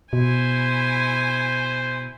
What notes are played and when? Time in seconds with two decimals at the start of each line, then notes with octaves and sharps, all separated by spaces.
0.13 B2 E4 C5 G#5